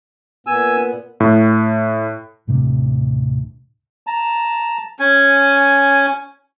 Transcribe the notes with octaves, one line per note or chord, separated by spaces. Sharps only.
A#2 B3 G#5 E6
A2
D#1 A2 C3 D4
A5 A#5
C#4 G#5